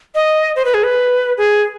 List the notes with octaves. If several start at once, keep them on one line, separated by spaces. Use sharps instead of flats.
D#5
C5
B4
G#4
B4
G#4